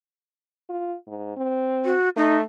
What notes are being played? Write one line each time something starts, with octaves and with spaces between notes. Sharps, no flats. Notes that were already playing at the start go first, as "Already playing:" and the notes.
F4
G#2
C4
F#4
A3 D#4